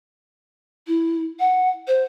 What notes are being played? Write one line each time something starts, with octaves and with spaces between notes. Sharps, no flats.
E4
F#5
C5